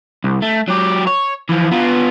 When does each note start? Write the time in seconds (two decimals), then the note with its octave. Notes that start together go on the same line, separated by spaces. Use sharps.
0.24 C2
0.42 A3
0.68 F#3 G4
1.07 C#5
1.49 E3 F3
1.71 B3 F4